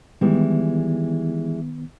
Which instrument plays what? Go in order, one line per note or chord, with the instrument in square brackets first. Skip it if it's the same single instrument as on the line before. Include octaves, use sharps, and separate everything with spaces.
[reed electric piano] D#3 B3 [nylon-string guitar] E3 G3 G#3